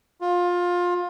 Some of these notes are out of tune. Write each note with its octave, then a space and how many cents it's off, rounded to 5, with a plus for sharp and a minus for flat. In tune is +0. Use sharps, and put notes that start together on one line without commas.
F4 +20